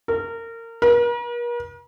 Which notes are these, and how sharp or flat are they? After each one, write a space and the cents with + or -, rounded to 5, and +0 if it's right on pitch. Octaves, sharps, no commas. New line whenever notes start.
A#4 -25
A#4 +45